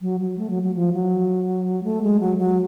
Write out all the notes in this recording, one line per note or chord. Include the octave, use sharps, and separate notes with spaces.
F#3
F#3
A3
F#3
F#3
F3
F#3
A3
G#3
F#3
F#3